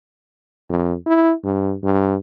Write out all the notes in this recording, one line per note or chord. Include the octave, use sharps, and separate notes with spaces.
F2
E4
G2
G2